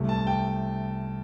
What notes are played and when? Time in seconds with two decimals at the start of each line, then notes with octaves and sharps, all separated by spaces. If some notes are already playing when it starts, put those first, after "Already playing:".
Already playing: C2 C3 A3
0.09 A5
0.27 G5